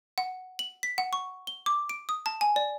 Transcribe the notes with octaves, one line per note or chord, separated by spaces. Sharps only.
F#5
F#7
B6
F#5
C#6
G7
D6
D7
D#6
A5
G#5
D5